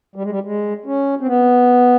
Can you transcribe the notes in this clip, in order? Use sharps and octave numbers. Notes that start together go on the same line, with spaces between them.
G3
G#3
G3
G#3
C#4
C4
B3